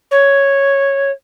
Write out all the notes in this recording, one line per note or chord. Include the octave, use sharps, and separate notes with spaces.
C#5